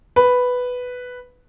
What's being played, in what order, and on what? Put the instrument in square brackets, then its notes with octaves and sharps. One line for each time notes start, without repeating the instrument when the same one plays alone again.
[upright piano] B4